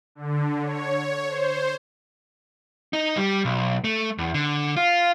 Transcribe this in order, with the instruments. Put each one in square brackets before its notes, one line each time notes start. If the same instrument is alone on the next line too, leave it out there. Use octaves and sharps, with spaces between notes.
[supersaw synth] D3
C#5
C5
[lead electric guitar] D#4
G3
B1
A3
E2
D3
F4